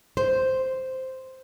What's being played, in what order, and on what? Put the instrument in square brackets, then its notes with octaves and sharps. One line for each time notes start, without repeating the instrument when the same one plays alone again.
[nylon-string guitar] C5